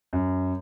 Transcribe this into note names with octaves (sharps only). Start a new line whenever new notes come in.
F#2